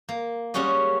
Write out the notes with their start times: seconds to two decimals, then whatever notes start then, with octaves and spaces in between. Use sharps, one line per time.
0.09 A#3
0.54 G3 G#3 C#4 F#4 G4 D#5